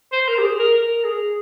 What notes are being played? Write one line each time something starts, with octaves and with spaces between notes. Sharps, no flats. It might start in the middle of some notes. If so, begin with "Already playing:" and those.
C5
A#4
G4
G#4
A#4
A#4
G#4